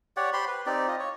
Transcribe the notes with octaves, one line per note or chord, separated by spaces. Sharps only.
G4 C#5 D5 F#5
G4 C5 B5 C6
B4
C4 D#4 G4 D5
F4 D#5
C#5